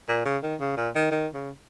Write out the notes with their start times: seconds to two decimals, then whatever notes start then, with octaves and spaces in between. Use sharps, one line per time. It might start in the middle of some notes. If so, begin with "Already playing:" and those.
0.09 A#2
0.26 C#3
0.43 D#3
0.60 C#3
0.77 A#2
0.95 D#3
1.11 D#3
1.34 C#3